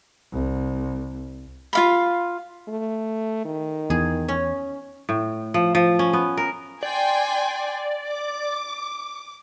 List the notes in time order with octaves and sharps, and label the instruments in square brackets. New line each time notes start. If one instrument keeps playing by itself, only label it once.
[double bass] C2
[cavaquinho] F4 F5 B5
[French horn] A3
D#3
[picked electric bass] E2 [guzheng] G#4
[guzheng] C#4
[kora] A2
F3
F3
C#4
B3
A#4
[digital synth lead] D5 [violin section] G5 G#5 C6
[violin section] D6